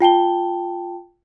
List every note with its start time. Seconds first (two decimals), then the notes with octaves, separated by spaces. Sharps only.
0.01 F4 G5 A5 G7